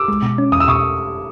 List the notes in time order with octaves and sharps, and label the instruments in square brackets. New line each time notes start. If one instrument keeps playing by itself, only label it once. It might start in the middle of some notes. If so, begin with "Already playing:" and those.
Already playing: [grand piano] D6 E6
[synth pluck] G#3
B2
C#4
[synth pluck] E2 [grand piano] D#6
[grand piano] E6
[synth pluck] B2 [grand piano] C#6 D#6